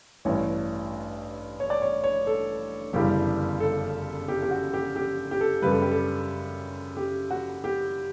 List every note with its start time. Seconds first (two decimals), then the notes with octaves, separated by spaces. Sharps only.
0.25 A1 G2 E3 C#5
1.60 C#5
1.70 D5
1.82 C#5
2.04 C#5
2.27 A4
2.93 G1 F#2 C#3 E3 G3 G4
3.60 A4
4.28 G4
4.43 G4
4.51 F#4
4.74 G4
4.96 G4
5.31 G4
5.41 A4
5.62 F#2 C#3 G3 B4
5.72 A4
5.82 G4
5.91 A4
6.97 G4
7.31 F#4
7.64 G4